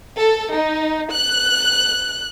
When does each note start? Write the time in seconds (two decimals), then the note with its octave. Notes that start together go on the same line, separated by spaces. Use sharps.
0.18 A4
0.56 D#4
1.12 F#6